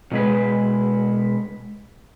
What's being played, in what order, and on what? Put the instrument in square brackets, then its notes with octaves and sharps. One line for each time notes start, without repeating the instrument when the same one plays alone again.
[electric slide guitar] B2 G#3 B4